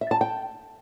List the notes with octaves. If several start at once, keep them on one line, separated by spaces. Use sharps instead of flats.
E5
A5
G5